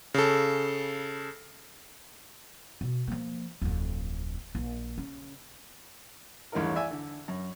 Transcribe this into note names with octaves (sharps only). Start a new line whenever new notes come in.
C#3 A4
B2
F3 A#3
D1 F2
A#1
C#3
A1 E2 G2 C#4 D#4 A#4
D5 E5 G#5
D3
F#2